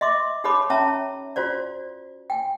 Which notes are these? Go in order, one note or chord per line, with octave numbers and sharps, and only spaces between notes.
D#5 E5 C6 D6
D#4 G4 A4 C#5 B5 D6
C#4 C#5 E5 A5 A#5
F4 F#4 C5 D5
G5 G#5